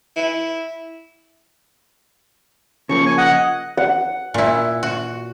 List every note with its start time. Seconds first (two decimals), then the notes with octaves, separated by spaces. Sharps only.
0.16 E4
2.89 C#3 F3 A#3 C#6
3.06 G#5
3.18 D#5 F#5
3.77 F#5
4.34 A#2 E4
4.83 F#4